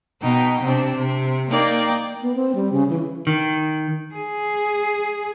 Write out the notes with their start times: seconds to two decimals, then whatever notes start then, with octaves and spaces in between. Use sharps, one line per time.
0.21 B2 D#4 G5
0.61 C3 C4 D4
0.95 C3
1.49 A#3 D#4 D5 G5
2.21 B3
2.35 C4
2.55 G3
2.72 C#3
2.89 E3
3.27 D#3
4.15 G#4